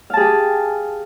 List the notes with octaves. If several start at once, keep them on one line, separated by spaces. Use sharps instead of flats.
G4 G#4 F5 A5